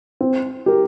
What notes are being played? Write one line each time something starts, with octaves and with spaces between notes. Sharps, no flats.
C4
G4 A#4